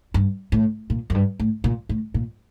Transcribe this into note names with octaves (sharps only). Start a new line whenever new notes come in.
G2
A2
A#2
F#2
G2
A2
A#2
A2
A#2